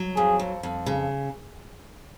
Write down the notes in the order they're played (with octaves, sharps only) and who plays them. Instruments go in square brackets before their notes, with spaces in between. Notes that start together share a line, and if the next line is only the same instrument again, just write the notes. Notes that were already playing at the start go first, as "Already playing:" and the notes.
Already playing: [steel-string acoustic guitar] F#3
[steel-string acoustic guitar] F2 [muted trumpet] G#4
[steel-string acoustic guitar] F2
F2
C#3